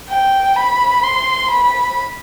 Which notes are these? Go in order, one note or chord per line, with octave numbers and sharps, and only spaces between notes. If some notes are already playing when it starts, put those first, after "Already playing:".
G5
B5
C6
B5